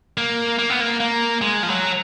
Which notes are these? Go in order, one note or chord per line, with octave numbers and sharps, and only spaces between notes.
A#3
A#3
B3
A#3
A#3
G#3
F3
F#3